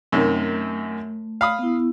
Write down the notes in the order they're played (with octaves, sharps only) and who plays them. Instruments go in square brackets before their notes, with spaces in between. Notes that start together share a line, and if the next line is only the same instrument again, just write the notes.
[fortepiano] F#2 C3 D#3 [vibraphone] A3
[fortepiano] F5 B5 D#6
[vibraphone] B3 E4